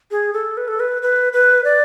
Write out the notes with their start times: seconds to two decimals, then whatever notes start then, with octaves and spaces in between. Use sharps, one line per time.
0.11 G#4
0.33 A4
0.57 B4
0.68 A4
0.80 B4
1.02 B4
1.33 B4
1.64 D5